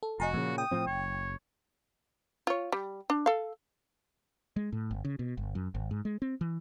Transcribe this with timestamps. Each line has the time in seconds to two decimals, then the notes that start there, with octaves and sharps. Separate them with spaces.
0.03 A4
0.20 F1 F#4 D#5 G#5 A#5
0.34 A#2 C#3 F3
0.58 G5 D#6
0.71 A2 F3 C4
0.87 F#1 C#5
2.47 F4 C#5
2.72 G3
3.10 D4
3.26 A4 F5
4.56 G#3
4.73 A2
4.91 G1
5.05 C#3
5.19 B2
5.37 G1
5.55 F#2
5.75 G#1
5.91 G#2
6.05 G#3
6.22 C4
6.41 E3